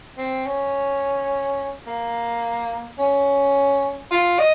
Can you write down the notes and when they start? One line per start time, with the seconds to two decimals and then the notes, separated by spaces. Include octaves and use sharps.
0.18 C4
0.46 C#4
1.87 A#3
2.99 C#4
4.11 F4
4.39 D#5